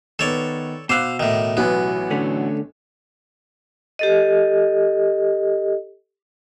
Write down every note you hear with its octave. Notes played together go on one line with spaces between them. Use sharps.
D#3 B3 A4 C#5 D5
B2 C5 F5 D6 E6 F#6
A2 D#3
A1 E3 F#3 B3
D3 A3 C#4
G4 A4 D#5